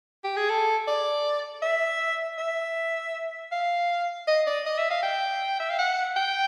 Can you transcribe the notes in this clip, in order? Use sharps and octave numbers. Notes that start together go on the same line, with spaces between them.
G4
G#4
A4
D5
E5
E5
F5
D#5
D5
D#5
E5
F5
G5
E5
F5
F#5
G5